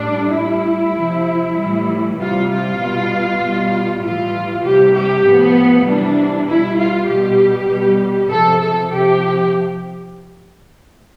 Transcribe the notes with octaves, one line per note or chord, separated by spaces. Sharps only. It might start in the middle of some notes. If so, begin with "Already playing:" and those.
Already playing: A2 G3 D4
A2 G3 E4
C3 F3
A2 E3 G3
C3 G3 F4
F4
B2 G3
B2 G3
A2 E3 G3 F4
C3 G3 G4
G4
A2 F3 B3
C3 E3 G3 D4
B2 G3 E4
F4
B2 G3 G4
B2 G3
C3 F3 A4
A4
C3 F3 G4